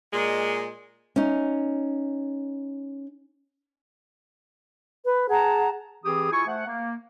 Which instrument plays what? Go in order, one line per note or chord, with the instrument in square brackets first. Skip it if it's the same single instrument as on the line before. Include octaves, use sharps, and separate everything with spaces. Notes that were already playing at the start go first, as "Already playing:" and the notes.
[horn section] A#2 G#3
[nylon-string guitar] C#4 D#4
[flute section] B4
G#4 F#5 A5 A#5
[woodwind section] E3 C4 G4 G#4 D#6
E4 F4 G#5 C#6
A3 C5 F#5
A#3